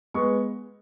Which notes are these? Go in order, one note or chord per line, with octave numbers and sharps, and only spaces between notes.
G#3 B3 C#6